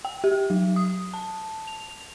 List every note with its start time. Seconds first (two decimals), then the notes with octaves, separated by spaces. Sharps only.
0.05 G5
0.24 G4
0.50 F#3
0.76 D#6
1.14 A5
1.68 F7